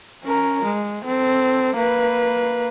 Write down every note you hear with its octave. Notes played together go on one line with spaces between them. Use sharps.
C#4 A#4
G#3
C4 A4
A#3 B4